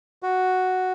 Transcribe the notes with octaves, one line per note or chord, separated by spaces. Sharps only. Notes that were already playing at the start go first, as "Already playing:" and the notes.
F#4